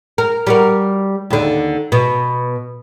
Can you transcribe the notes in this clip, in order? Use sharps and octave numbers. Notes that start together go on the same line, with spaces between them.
A#4
G3 F#4 A#4
D#2 D3
B2